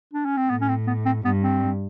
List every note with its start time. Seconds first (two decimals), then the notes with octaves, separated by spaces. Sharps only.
0.13 D4
0.25 C#4
0.37 C4
0.50 A2 B3
0.61 C#4
0.69 C4
0.87 B3
1.06 C4
1.24 G2 B3
1.43 C4